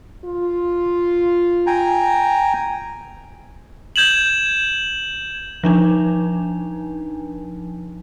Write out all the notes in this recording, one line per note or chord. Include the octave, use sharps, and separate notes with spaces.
F4
G5 G#5 A#5
G6 G#6 E7 F#7
F3 D4 D#4